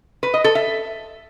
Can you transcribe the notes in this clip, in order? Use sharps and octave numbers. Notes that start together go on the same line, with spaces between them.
B4
D#5
A4
E5